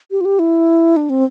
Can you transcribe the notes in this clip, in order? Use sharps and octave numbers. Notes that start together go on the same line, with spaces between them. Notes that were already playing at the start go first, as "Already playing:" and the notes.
G4
F4
G4
E4
D4
C4